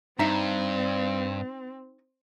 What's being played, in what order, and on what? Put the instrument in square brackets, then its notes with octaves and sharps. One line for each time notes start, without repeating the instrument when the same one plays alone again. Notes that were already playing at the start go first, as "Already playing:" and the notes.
[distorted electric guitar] G2 [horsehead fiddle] C4 [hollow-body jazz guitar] D#4 E5 A#5